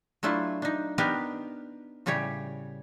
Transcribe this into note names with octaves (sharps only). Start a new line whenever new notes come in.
F#3 A3 D4 E4 F4
D4 D#4
B3 D4 D#4 G4 A#4
A2 C#3 G3 G4 C#5